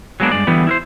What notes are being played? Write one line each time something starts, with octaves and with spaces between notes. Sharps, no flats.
F#3 G#3 A#3 B3 D4
G2 C#3 G#3 D5
D3 E3 G3 B3
E4 A#4 C5